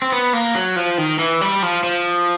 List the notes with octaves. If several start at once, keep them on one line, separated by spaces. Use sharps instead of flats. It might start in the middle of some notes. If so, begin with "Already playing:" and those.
C4
B3
A#3
F#3
F3
D#3
E3
G3
F3
F3